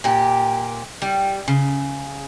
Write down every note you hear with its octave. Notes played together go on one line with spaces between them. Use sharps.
A#2 G4
G3
C#3